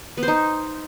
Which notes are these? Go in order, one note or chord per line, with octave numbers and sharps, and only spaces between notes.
B3
C5
D#4